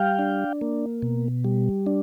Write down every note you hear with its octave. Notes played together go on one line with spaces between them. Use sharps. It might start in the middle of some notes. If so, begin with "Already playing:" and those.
Already playing: G3 F5 G5
D4
A#3
B2
G3
D4